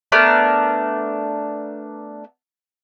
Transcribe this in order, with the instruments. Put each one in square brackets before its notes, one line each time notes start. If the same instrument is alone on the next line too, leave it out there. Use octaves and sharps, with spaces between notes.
[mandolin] A3 B3 D4 A#4